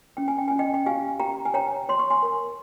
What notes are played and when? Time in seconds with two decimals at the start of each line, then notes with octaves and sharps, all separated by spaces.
0.17 C#4 G5
0.28 G#5
0.39 G5
0.48 C#4 G#5
0.59 D#5 G5
0.74 G5
0.86 G4 F5 G#5
1.20 G4 G5 A#5
1.45 G#5
1.54 C#5 G5 A#5
1.89 C#5 C6
1.99 C#6
2.10 G#5 C6
2.22 A#4